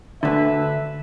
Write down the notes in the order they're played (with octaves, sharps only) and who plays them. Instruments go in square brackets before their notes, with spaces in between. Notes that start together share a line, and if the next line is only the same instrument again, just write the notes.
[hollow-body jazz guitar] D2 D3 [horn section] A4 B4 E5